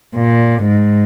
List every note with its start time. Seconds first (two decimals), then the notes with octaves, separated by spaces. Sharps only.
0.16 A#2
0.68 G#2